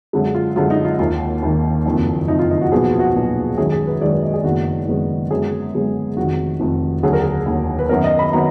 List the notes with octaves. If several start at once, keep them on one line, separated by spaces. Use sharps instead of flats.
F#2 D3 G#3
F4
F#2 D3 G#3 F4
D#4
F4
D#2 D#3 A#3 F4
D#2 D#3 A#3
F#1 F2 D#3
F#1 F2 D#3 D#4
F4
D#4
F#4
B1 A#2 F3 B3 G#4
F#4
F4
F#4
B1 A#2 F3 B3
F#2 D#3 G#3 G#4
G#4
B4
F#2 D#3 G#3 D5
B4
D#5
G#4
F#1 F#2 D#3 G#3 B3 F#4
F#1 F#2 D#3 G#3 B3
F#2 D3 G#3 B3 G#4
F#2 D3 G#3 B3
F1 F2 D#3 F#4
F1 F2 D#3
D#2 D3 F#3 G#4
A#4
G#4
D#2 D3 F#3
B4
F#2 D#3 F#3 B3 A#4
D#5
B5
D#3 F#3 B3 A#5